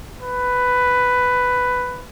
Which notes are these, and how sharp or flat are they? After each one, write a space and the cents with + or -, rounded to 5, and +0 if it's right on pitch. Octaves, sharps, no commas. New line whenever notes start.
B4 +10